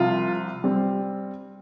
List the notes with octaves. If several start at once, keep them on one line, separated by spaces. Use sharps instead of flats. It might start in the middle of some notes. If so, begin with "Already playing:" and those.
Already playing: C2 C3 F3 F4
G3 C4